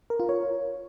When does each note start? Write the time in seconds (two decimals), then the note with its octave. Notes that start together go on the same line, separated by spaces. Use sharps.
0.10 A#4
0.20 F4
0.29 C#5